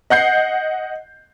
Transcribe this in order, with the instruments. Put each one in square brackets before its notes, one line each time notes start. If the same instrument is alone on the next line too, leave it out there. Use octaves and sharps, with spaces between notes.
[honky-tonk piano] D#5 F#5 G6 C7